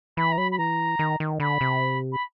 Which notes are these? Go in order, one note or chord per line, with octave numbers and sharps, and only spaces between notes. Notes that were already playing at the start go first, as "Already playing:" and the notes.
E3 B5
A#5
F#3 B5
B5
E3 A#5
D#3
D#3
D3 B5
C3
B5